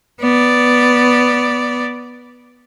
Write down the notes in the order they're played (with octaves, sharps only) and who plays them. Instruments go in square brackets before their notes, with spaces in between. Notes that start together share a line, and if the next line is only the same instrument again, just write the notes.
[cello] B3 D5